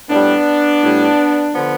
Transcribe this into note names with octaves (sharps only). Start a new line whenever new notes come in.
A2 G3 B3 D4
A2 G3
D3 F3 B3